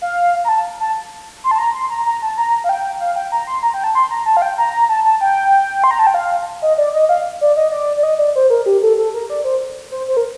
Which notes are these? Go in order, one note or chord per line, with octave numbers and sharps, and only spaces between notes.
F5
A#5
A5
A5
C6
A5
A#5
C6
A#5
A#5
A5
A#5
F5
G5
F5
G5
A#5
C6
A#5
G5
A5
C6
A#5
A5
F5
G5
A#5
A#5
A5
A5
G5
C6
A#5
A5
G5
F5
D#5
D5
D#5
F5
D5
D#5
D5
D5
D#5
D5
C5
A#4
G4
A4
A4
A#4
D5
C5
C5
C5
A#4